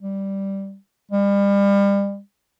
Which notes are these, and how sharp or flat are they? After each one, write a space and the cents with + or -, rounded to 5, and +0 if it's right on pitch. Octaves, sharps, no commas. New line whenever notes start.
G3 -5
G3 +35